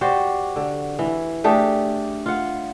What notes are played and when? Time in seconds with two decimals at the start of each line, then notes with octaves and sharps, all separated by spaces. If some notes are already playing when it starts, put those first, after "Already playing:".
0.01 F#4 G4 C5 D5
0.56 D3
0.99 E3
1.44 A3 D4 G4 G#4
2.26 F4 F#5